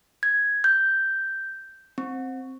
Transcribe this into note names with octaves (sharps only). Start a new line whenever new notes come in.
G#6
G6
C4